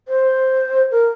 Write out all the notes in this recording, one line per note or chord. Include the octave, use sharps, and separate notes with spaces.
C5
A#4